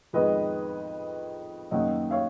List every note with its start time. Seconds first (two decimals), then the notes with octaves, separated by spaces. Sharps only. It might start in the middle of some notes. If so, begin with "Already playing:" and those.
0.13 F2 D#3 G#3 B3 B4 D#5
1.71 F#2 D#3 A#3 C#4 D#5 F#5
2.11 C#5 F5